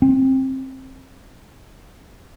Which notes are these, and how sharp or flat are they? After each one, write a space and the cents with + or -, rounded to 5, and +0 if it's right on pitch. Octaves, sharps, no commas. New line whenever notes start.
C4 +20